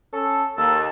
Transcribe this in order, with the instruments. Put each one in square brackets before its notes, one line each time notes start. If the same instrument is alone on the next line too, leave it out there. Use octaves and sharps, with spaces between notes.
[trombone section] C#4 A4
[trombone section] D#2 [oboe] A4